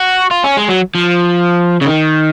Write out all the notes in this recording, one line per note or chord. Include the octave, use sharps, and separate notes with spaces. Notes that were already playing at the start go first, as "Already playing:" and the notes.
Already playing: F#4
F4
C#4
G#3
F#3
F3
C#3
D#3